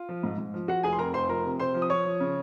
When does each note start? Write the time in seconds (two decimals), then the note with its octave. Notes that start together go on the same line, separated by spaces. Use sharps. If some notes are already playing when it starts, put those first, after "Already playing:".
Already playing: F4
0.09 F3
0.23 G#2
0.38 G#2
0.54 F3
0.68 F3 F#4 F#5
0.83 F1 G#4 G#5
0.93 C6
0.99 F2 A#4 A#5
1.14 F1 C5 C6
1.29 F3 A#4 A#5
1.44 C3
1.60 C3 C5 C6
1.74 F3
1.82 D#6
1.90 F3 C#5 C#6
2.05 F3
2.20 C#3